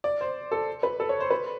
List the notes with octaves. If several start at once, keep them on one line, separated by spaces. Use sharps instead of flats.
D5
C5
A4
B4
A4
C#5
C5
B4